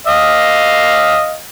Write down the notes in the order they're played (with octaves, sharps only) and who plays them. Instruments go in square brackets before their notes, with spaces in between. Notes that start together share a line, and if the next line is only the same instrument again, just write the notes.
[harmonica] D#5 F5